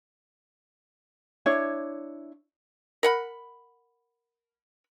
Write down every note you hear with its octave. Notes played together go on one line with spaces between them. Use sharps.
D4 E4 C#5
A#4 F#5 B5